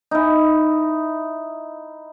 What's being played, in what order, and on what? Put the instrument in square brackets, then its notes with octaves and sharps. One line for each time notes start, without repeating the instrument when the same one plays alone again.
[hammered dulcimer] D#4 E4